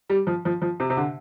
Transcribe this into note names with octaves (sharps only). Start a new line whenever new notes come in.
G3
F3
F3
F3
C3
C3
D3